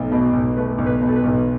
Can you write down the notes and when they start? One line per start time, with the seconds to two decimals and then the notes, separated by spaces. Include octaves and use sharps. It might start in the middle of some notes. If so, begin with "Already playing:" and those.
Already playing: B1 A3
0.12 B2
0.33 B1
0.57 A3 B4
0.78 B1
0.86 B4
1.02 B2
1.09 A4
1.16 B4
1.24 B1